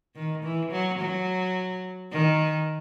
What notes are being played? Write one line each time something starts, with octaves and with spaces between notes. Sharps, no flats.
D#3
E3
F#3
F#3
D#3